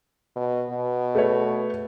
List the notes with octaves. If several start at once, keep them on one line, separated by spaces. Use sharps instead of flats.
B2
B2
A3 B4 C#5